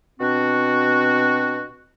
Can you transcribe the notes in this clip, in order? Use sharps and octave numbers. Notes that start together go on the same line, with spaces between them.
B2 C4 D4 F#4